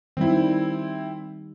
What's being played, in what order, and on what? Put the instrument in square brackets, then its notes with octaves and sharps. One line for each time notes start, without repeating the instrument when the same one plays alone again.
[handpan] D#3 G3 [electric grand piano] C4 E4